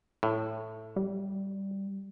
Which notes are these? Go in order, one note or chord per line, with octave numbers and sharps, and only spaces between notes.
A2
G3